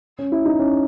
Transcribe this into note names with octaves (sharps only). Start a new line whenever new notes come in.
C#4
E4
D#4
C#4